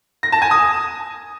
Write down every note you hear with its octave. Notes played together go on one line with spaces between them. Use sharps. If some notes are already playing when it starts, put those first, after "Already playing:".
A#6
A5
G#5
D#6